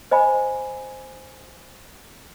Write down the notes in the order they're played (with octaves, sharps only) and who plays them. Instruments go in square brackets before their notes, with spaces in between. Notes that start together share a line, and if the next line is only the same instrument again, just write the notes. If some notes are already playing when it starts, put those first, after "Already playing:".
[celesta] C5 D#5 G#5 B5